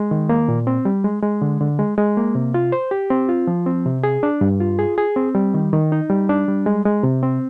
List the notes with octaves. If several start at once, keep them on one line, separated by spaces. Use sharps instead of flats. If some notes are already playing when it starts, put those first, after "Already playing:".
Already playing: G#3
D#3
A#3
A#2
C4
G3
G#3
G#3
D3
D3
G#3
G#3
A#3
C3
F4
C5
G4
C4
F4
F3
C4
C3
G#4
D4
G2
F4
G#4
G#4
C4
G3
D#3
D#3
D#4
G3
D4
G3
G#3
G#3
C3
C4